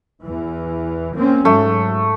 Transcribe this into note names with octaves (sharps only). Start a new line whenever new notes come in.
E2 E3
A#3 C4 C#4
G#2 F#3 A3